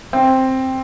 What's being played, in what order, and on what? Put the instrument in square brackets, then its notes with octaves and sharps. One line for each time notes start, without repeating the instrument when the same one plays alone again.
[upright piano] C4